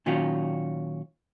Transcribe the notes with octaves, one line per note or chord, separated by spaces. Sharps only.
A#2 D#3 F#3 C#4 F4 F#4